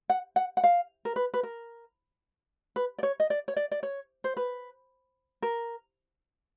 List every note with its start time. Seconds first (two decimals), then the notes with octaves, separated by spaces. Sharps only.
0.10 F#5
0.36 F#5
0.57 F#5
0.64 F5
1.05 A#4
1.16 B4
1.34 B4
1.43 A#4
2.76 B4
2.98 D5
3.03 C#5
3.20 D#5
3.30 D5
3.48 C#5
3.56 D5
3.71 D5
3.83 C#5
4.24 C5
4.37 B4
5.42 A#4